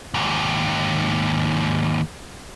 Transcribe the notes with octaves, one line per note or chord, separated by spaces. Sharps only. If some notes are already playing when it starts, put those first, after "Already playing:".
D#2 G#2